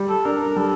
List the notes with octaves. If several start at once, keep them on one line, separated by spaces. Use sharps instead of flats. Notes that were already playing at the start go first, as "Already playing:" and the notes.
Already playing: G3
A4
D4 A#4
A#4
G3 A4